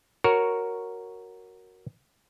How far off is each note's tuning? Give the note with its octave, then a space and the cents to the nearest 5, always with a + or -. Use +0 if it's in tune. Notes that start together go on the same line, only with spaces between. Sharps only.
F#4 +0 A#4 +0 C#5 +0